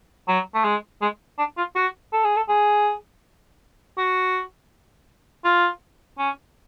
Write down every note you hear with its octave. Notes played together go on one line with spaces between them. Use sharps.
F#3
A3
G#3
G#3
D4
F4
F#4
A4
G#4
A4
G#4
F#4
F4
C#4